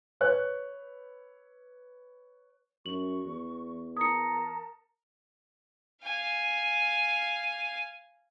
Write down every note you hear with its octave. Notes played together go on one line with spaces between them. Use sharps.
B4 C#5 F#6
F#2 C#6 F#7
E2
A#4 A5 A#5 D#6 C#7
F5 G#5